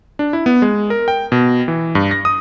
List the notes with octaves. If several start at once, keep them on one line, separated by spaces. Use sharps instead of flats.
D4
E4
B3
G#3
A#4
G5
B2
E3
G2
A#6
D#6